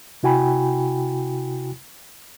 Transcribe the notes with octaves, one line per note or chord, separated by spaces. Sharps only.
C3 E4 F#4 G5 G#5 B5